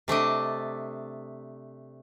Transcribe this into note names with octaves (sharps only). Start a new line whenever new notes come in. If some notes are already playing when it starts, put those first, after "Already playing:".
C3 A3 D4 D#5